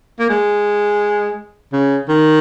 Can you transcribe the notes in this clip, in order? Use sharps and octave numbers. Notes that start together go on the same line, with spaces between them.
A#3
G#3
C#3
D#3